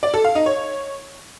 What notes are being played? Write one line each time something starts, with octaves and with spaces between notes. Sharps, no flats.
D5
A4
F5
D#4
C#5